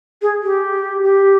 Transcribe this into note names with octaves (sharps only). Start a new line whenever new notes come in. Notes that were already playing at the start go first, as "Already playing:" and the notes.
G#4
G4
G4